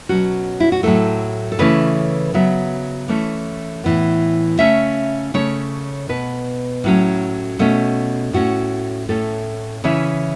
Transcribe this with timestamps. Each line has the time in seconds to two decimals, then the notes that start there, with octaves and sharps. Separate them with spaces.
0.09 B2 F#3 C#4 F#4
0.60 E4
0.72 F#4
0.83 A2 F#3 A3 A4
1.52 A4
1.59 C#3 E3 A3 C#4 B4
2.34 C#3 F#3 B3 E5
3.08 E3 A3 C#4
3.84 A2 E3 B3
4.59 C#3 A3 C#4 E5
5.34 C#3 A3 C#4 C#5
6.09 B2 B3 B4
6.84 A2 F#3 A3 C#4
7.59 B2 A3 C#4
8.33 A2 A3 C#4 F#4
9.09 A2 A3 C#4 A4
9.84 C#3 E3 C#4 E5